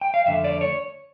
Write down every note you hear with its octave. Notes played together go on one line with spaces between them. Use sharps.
G5
F5
F2 D3 A3 E5
D5
C#5